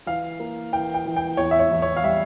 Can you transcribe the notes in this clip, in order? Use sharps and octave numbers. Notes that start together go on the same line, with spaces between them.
E3 F5
A#3
E3 G5
G5
E3
G5
E2 C#5
E5
C#5
E2
C#5
F5
G3 E5